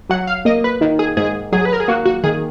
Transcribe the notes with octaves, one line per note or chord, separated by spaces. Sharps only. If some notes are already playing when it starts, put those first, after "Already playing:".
F#3 F#5
F5
A#3 D#5
B4
D#3
G#4
G#2 G#4
F#3 G#4
B4
A#4
G#4
A#3 F#4
F#4
D#3 G#4